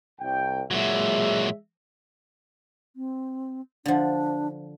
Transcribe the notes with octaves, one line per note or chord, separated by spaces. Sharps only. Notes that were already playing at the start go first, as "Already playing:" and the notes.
C2 G5
A#2 F#3 G#3 E5
C4
D3 F3 D4